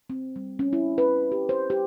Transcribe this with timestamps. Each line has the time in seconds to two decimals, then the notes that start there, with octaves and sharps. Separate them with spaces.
0.10 C4
0.36 G3
0.59 C#4
0.73 E4
0.98 B4
1.32 G4
1.49 C5
1.70 G4